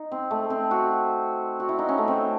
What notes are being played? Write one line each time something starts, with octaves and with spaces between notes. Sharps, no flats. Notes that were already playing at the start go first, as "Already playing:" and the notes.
Already playing: D#4
C4
A3
C4
F#4
F#4
E4
D#4
C#4
A3
C4